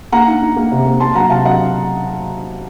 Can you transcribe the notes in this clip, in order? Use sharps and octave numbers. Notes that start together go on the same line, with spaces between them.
A#3 F#5 A#5
D#4
D#4
A#3
C3
A#3
A#3 A5 C6
F#3 F#5 A#5
C3 F5 A5
F#3 D#5 F#5